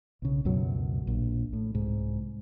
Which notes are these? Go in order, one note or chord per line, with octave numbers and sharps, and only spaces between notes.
B1 C#3
C#2 F#2 B2 F#3
A#1
A2
C2 G#2